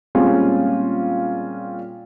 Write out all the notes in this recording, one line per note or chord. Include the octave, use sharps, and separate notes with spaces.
A#2 G3 G#3 C4 C#4 F4